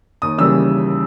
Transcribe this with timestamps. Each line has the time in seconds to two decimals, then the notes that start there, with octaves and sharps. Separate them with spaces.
0.22 D#2 D#6
0.38 C#3 E3 G3 A#3 E6